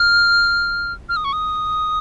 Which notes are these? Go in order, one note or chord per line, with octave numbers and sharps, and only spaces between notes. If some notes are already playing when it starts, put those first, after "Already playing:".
Already playing: F6
F6
D#6
C#6
D#6